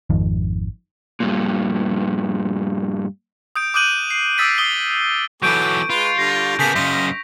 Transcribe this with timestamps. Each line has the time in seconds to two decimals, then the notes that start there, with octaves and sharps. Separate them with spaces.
0.10 G#1 F2 D#3 F3
1.20 G2 A#2
3.55 D#6 G6 D7
3.74 D6 D#6 F#6 G6 D#7 F#7
4.11 C7
4.38 D#6 E6 A6 B6 D7
4.58 D#6 C7 G7
5.42 E3 F#3 B3 A4 C#6 D6 G6 D7
5.90 G#3 F4 B4
6.18 D3 G3 A#6 F7
6.59 C#3 A#3 B3 G#4 A5 G6 B6
6.75 F#2 C#3 D#5 F5 C6